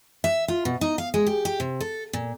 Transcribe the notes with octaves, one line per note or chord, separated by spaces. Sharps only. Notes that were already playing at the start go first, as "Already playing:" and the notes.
E5
F4
B2
D#4
F5
G#3
G4
G4
C3
A4
A#2